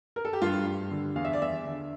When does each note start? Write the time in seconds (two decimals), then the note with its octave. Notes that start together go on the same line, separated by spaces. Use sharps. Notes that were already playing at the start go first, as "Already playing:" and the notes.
0.16 A#4
0.25 A4
0.33 G4
0.42 G2 F4
0.66 G2
0.91 D3
1.16 E2 F5
1.25 E5
1.33 D5
1.41 E2 E5
1.66 D3